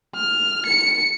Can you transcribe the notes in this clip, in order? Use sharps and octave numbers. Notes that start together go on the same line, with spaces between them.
F6
C#7